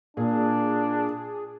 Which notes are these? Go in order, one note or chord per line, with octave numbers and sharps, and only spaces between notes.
A#2 D4 G#4